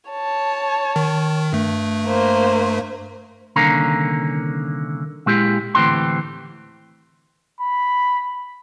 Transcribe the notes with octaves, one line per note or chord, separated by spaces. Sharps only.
C#5 A5
D#3
G2 A3
A#3 C5
C2 D3 D#3 A#3 C#4 A#5
A#2 G#3 E4 G4
D2 A2 E3 C4 G4 C6
B5